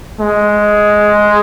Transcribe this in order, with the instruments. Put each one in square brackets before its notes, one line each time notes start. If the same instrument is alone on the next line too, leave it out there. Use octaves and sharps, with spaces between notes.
[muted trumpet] G#3